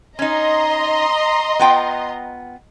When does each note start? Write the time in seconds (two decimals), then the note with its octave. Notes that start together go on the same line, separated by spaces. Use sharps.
0.19 C#4 D#4 D#5 A#5 C6
1.59 B3 F4 G5